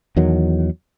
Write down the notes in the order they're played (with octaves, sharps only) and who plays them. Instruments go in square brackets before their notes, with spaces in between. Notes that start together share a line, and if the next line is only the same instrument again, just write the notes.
[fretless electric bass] E2 D#3 F#3